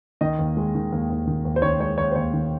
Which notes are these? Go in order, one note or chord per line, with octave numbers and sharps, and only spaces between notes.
D#3 D#5
D#2
G#3
D#3
D#2
D#2
D#3
D#2
C5
D#3 C#5
G#3 C#5
D#2 C#5
C5
D#2 C#5
D#3